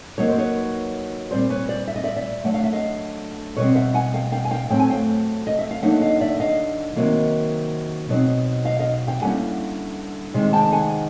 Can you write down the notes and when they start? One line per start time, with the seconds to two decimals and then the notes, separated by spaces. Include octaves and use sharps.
0.18 F#3 A#3 D#4 C#5
0.29 C5
0.38 B4 C#5
1.31 A#2 G3 C4 C5 D5
1.50 B4 C#5
1.69 C5 D5
1.88 E5
1.96 D#5
2.04 D5 E5
2.16 D5 E5
2.44 D3 F#3 A3 F#5
2.54 F5
2.64 E5
2.73 D#5 F5
3.57 B2 G3 C4 B4 C#5
3.76 E5 F#5
3.94 F#5 G#5
4.14 F5 G5
4.32 F5 G5
4.45 G#5
4.51 F5 G5
4.70 A2 F#3 A3 C4 G5
4.80 G#5
4.90 F5 G5
5.47 D#5
5.59 E5
5.71 F5
5.83 D3 F#3 A#3 D#4 E5 F#5
6.01 D#5 F5
6.20 D5 E5
6.40 D#5 F5
6.96 C3 D#3 F#3 A#3
8.09 B2 F#3 A3 C4 D#4
8.65 D#5 F5
8.79 D#5 F5
9.07 F5 G5
9.22 D3 G3 A#3 C#4 E4 F#5 G#5
10.34 C3 D#3 G#3
10.53 G5 A5
10.63 A5
10.72 F#5 G#5